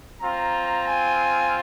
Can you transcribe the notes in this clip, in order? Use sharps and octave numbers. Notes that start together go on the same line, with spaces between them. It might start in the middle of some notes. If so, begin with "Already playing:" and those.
C4 F4 A#5
G#5